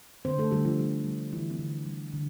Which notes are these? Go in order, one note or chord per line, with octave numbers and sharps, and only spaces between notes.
D3 C4 C5
A3 A4
D3 G3 G4
F3 F4
G3
G3
D3 E3 E4
C4
D3
G3
D3